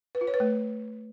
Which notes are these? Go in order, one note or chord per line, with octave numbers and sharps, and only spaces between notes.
B4
F4
C#5
B4
A3